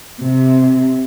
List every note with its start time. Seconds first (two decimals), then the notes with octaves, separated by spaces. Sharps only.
0.21 C3